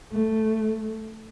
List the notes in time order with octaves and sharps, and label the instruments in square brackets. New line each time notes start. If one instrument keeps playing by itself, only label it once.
[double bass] A3